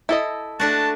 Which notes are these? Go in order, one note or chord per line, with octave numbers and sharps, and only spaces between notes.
E4 A4 D#5
A3 D4 F#4 A5